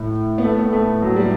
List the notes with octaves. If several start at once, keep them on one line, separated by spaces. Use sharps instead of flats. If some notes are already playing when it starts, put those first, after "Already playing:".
Already playing: A2
B3
A3
B3
A3
F#3
G3